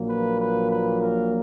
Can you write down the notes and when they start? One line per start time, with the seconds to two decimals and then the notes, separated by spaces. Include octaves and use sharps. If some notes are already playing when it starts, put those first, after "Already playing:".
Already playing: A#1 A#2 F#3 A#3
0.09 B4
0.39 B4
0.70 B4
1.01 A#4